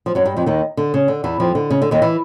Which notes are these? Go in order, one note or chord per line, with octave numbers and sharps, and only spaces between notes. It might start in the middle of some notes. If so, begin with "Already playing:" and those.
F3
F#2 F#3
G2 G3
F2 F3
D#2 D#3
D3
C#3
D3
E2 E3
F2 F3
D3
C#3
D3
D#2 D#3
E3